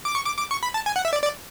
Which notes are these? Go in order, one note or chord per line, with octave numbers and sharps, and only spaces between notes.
D6
C#6
D6
D6
C#6
B5
A5
G#5
F#5
E5
D5
D5